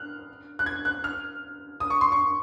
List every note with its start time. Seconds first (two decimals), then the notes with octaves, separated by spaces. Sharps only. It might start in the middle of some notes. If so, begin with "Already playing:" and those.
Already playing: F6 F#6
0.59 F#6
0.66 G#6
0.85 F#6
1.04 F6
1.80 D#6
1.90 C#6
2.01 C6
2.12 C#6